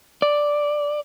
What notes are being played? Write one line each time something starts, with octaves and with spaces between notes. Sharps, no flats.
D5